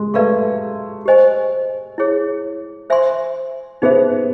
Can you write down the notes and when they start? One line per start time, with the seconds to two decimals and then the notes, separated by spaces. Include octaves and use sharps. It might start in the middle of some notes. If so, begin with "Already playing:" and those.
Already playing: G#3
0.14 A3 B4 D5 F5 A#5 C#6
1.06 G4 C5 D#5 G#5
1.98 E4 G#4 C#5
2.90 C5 E5 G#5 C6
3.82 B3 D#4 G#4 C5 E5